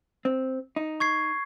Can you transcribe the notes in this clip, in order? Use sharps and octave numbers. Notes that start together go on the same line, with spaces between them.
C4
D#4
C#6 G#6 C7